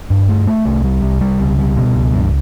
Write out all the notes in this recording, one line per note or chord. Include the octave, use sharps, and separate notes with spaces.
G2
A3
A3
C2
G3
C2
G3
C#2
G3
B2
C#2
G2